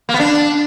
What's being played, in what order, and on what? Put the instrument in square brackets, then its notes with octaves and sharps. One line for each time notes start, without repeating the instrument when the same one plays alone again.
[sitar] A#3
B3
D4